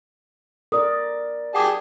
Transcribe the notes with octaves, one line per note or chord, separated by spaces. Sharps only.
A4 A#4 D5 D#6
G4 G#4 F#5 A5 D6